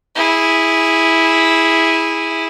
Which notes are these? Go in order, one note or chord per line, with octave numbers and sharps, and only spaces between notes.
E4 G#4